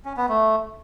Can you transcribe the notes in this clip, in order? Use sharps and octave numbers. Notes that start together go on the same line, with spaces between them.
C#4
B3
A3